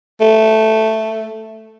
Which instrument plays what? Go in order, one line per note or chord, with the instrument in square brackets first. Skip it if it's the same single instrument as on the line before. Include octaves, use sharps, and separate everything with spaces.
[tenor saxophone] A3